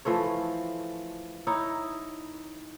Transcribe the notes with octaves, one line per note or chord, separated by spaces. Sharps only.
E3 F3 A3 C#5
D#4 E4 C#5